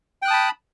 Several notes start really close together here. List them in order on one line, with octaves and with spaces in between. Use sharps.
G5 F#6 D#6 A5 B5